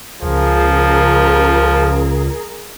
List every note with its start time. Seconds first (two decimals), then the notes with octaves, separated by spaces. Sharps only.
0.22 C#2 F3 G#4 A#4